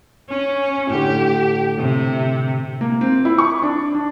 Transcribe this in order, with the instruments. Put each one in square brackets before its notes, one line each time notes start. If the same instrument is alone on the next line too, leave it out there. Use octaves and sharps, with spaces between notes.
[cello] C#4
[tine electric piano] A2 D3 [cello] G4
[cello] C3
[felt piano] A#3
C4
E4
C#6
D4
D4